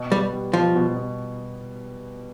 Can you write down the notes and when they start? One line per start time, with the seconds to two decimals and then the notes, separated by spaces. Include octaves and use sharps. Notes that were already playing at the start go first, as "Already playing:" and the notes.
Already playing: B2
0.11 G3 B3
0.33 G3
0.53 B2 F3
0.75 B2
0.96 B2